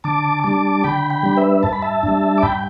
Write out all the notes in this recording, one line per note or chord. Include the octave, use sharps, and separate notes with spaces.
D3 A5 D6
G3 D4 A5 D6
D3 G5 B5
G5 B5
G3 D4
B4 E5
G2 A5
B5
E5 A5
D4
G3
D6
G2 G5 B5